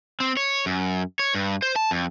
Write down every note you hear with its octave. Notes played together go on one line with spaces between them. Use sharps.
C4
C#5
F#2
C#5
G2
C5
A5
F2